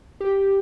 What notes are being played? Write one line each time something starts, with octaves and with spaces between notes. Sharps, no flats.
G4